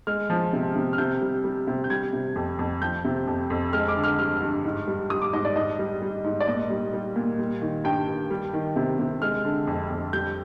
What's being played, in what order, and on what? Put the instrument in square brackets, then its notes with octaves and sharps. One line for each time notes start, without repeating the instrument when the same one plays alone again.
[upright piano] G#3 F6
F3
C3
C3
F6
C3 G6
G3
G3
C3
G6
G3 G#6
C3
F2
F2
F3 G6
C3
F2
F2
G#3 F6
D6
D3
F6
G2 F6
G2
G#2
G3
G3 D#6
D6
G#2 D#5
D5
G#2 D#5
G3
G3
G#2
D5
A#2 D#5
G3
G3
A#2
G3
D#3
G2 G5
G2
G3
D#3
C3
C3
G#3 F6
D3
F2
F2
G3 G6